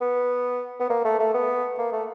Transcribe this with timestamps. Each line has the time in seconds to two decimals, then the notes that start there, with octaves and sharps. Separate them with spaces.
0.01 B3
0.80 B3
0.90 A#3
1.05 A3
1.20 A3
1.34 B3
1.78 A#3
1.93 A3